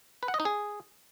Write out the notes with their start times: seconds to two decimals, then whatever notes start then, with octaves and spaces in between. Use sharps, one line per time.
0.23 B4
0.28 F#5
0.34 D#5
0.40 D#4
0.45 G#4